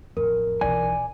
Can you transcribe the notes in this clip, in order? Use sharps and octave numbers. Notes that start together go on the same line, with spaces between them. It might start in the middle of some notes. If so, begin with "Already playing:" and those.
A1 F2 A#4
B1 E3 D5 G#5